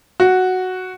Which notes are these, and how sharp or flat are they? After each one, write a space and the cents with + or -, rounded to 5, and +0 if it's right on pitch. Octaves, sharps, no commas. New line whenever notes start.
F#4 +0